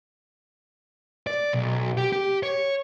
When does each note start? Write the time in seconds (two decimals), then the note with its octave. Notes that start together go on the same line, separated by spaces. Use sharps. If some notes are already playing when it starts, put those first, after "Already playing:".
1.27 D5
1.53 B1
1.97 G4
2.12 G4
2.43 C#5